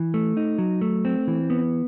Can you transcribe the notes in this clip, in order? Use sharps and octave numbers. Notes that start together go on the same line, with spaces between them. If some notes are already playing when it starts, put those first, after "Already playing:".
Already playing: E3
A3
D#4
F#3
A3
C4
E3
B3